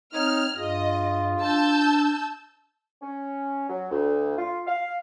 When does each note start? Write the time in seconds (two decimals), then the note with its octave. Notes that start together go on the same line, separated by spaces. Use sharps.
0.14 C4 D#4 C#5 F6 G#6
0.57 G2 F4 G#4 D#5
1.42 D4 A5 E6 G6
3.02 C#4
3.70 F#3
3.91 D2
4.38 F4
4.67 F5